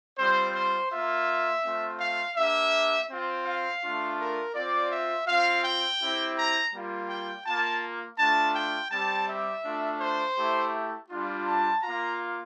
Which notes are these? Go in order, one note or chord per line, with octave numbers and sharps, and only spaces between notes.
G3 C4 F4 C5
C5
A#3 F4 E5
A3 C4 F4
F5
A#3 D4 G4 E5
C4 F4
F5
A3 D4 F4
A#4
C4 F4 D5
E5
C4 F4 F5
G5
C4 E4 G4
A#5
G3 A#3 F4
G5
A#3 F4 A5
A3 D4 F4 A5
G5
G3 C4 G4 A5
E5
A3 D4 F4
C5
A3 E4 G4
G3 D4 F4
A5
A#3 F4 A#5